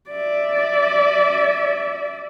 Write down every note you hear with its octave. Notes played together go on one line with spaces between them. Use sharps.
D5 E5